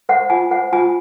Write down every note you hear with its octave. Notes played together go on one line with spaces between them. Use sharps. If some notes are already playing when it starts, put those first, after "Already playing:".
C5 F#5
F4 G#5
C5 F#5
F4 G#5